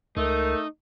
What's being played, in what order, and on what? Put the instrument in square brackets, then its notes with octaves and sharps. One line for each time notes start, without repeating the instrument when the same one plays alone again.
[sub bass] C#2 [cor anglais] A3 [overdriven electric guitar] D#4 [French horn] A#4